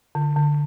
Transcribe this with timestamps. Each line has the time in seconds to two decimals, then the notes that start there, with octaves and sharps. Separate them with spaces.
0.15 D3
0.36 D3